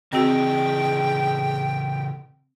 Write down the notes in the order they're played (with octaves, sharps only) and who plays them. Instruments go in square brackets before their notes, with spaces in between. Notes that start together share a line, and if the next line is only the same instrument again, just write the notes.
[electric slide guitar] C#3 E3 D#5 [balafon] C4 F#4 [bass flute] G#4 [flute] G5